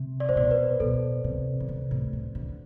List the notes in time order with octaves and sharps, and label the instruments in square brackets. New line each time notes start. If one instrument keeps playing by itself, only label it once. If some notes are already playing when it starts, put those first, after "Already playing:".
Already playing: [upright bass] C3
[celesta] D5
[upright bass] A2 [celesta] C5
[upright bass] B2 [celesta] D5
[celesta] B4
[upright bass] B2 [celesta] A4
[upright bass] C3
D3
C3
A2
C3
D3